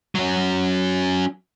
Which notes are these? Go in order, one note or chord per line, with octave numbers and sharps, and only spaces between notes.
F#3 C#4